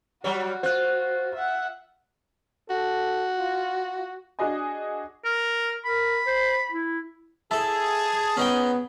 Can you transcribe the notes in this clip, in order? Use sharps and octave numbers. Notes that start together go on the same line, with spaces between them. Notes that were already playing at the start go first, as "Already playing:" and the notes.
F#3 G3 F#4 C#5
F4 C5 F#6
E5 F#5
F#4 A4
F4
D4 F#4 G#4 D#5 G#5
A#4
A#4 B5
C5
E4
E4 G#4 A4 A5
B3 C#4 D#4 G5